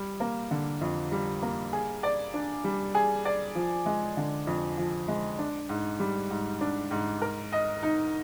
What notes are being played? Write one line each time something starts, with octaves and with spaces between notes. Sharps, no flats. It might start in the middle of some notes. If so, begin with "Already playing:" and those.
Already playing: G3
A#3
D3
F2
G3
A#3
G#4
D5
D4
G3
G#4
D5
F3
G#3
D3
F2
F3
G#3
D4
G#2
G3
G#2
D4
G#2
A#4
D#5
D#4